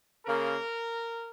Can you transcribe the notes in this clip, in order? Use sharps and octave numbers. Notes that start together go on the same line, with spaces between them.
C#3 A#3 A#4